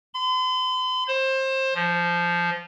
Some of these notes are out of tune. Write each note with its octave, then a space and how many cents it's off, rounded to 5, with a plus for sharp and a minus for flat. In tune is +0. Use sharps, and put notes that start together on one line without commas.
C6 -45
C5 +25
F3 -10